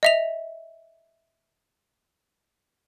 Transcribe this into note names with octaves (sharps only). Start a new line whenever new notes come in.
D#5 E5 F7